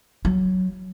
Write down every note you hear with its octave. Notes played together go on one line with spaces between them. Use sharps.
F#3